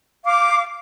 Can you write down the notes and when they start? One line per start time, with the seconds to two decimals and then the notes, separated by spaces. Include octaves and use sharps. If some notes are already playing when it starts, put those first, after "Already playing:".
0.24 F5 D6